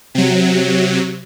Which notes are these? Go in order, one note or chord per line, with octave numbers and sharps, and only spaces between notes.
C3 F#3